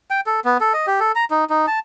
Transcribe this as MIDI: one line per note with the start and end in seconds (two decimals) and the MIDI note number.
0.11 0.21 79
0.27 0.40 69
0.45 0.57 59
0.61 0.73 69
0.74 0.86 75
0.87 1.00 67
1.00 1.12 69
1.16 1.25 82
1.31 1.45 63
1.50 1.66 63
1.67 1.79 81